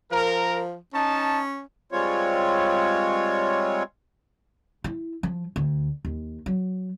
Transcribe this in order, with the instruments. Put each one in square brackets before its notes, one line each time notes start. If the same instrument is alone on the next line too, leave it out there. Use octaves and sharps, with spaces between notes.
[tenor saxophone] F3 [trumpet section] A#4
[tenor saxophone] C#4 [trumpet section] D#4 A5
[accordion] G3 G#3 C4 F4 C#5
[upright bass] E4
F3
D2
D#2
F#3